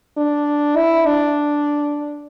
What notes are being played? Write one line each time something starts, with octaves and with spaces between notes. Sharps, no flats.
D4
E4
D4